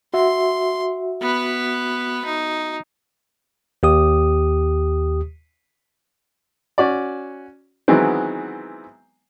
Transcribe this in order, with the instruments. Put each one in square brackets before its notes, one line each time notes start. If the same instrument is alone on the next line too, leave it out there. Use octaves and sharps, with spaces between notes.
[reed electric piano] F#4 E5 [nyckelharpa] C6
[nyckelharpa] B3 B4
D#4
[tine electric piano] D#2 G4 D#6
[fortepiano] C#4 F#4 D5
D#3 E3 F#3 G#3 B3 C4